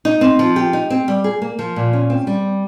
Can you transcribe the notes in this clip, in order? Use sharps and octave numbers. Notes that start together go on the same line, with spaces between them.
D#4
C4
F3
G4
D#4
C4
G3
G#4
A#3
F3
A#2
C#4
C4
G3